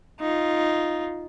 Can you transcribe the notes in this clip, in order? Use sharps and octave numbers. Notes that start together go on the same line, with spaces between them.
D#4 F4